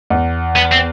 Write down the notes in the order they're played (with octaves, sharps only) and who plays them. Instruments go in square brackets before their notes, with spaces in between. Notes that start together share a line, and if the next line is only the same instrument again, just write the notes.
[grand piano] E2
[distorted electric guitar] B3
C4